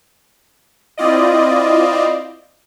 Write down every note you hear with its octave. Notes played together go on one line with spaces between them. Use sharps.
C4 E4 F4 D5 D#5